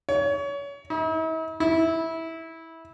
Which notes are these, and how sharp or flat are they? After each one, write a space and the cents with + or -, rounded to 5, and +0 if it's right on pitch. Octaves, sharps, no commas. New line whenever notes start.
C#5 +30
E4 -45
E4 -15